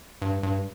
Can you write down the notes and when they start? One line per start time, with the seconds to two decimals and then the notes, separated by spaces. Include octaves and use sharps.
0.22 G2
0.43 G2